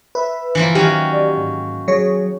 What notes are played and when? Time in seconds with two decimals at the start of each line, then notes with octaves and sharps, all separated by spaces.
0.15 B4 E5
0.55 E3 F3 A#3
0.75 D#3 F#3 C#4 G4
1.12 D5
1.37 G#2
1.88 F#3 G#4 C#5